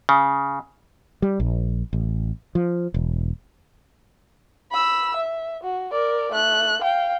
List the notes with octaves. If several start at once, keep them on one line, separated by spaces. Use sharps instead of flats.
C#3
G3
A#1
A1
F3
E1
B5 E6
E5
F#4
A#4 D5
A3 F#6
F5 G5